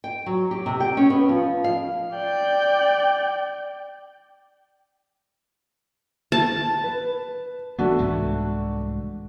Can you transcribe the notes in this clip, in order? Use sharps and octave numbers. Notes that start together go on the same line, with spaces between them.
G5
F#3
G4
C3
G5
C#4
B3
F3
F5
D5 G5
A5
B4
E3 A3 B3 D4 F#4
C2 G#2 E3